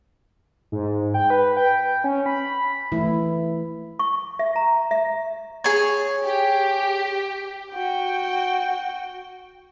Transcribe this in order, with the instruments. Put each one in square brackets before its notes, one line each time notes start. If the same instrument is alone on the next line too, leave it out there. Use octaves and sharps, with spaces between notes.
[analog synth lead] G#2
G5
B4
G5
C#4
B5
[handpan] E3 A3 E4
[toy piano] C#6
E5
A#5
E5
[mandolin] G#4 C#5
[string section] G4
[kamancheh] F#4 G5